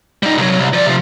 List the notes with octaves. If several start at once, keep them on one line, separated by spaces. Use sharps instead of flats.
G3 D#4
C2 F#3
C2
F3 D5
C3 F3